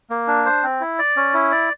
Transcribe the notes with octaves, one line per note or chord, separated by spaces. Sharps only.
A#3
D4
C5
C4
E4
D5
C#4
E4
D5